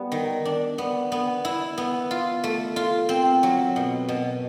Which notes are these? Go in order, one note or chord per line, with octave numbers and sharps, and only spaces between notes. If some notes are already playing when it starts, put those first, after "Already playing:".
Already playing: G3 B3
D#3
D4
B3
B3
E4
B3
F4
A3
F4
C4
F#3
B2
B2